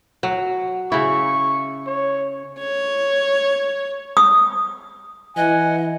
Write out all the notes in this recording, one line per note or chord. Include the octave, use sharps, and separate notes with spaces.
F#3
C#3 E4 C#6
C#5
C#5
D#6
E3 D#5 F#5 G#5